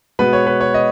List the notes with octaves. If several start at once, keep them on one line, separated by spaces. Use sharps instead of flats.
B2 G#3 B3 B4
C#5
B4
C#5
D#5